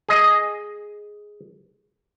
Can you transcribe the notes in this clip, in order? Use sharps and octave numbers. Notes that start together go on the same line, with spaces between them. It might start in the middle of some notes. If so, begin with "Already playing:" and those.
G#4 D#5